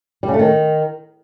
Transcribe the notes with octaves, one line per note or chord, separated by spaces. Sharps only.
G3
C#3
A3
D#3